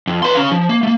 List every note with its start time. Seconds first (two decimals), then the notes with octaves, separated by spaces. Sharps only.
0.07 F2
0.23 B4 C6
0.35 C#4 F5
0.52 F3
0.69 A#3
0.83 A3 A#3